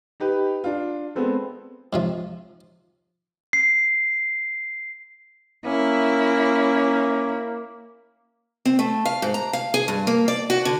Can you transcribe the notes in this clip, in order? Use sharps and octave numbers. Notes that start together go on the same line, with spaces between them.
D#4 G4 B4
D4 F4
G#3 B3 C4 A4
G#2 C3 F3
C7
A#3 C#4 E4
C4
A3
F5
G#2
A#5
F5
G#4
G2
A#3
D5
F#4
D3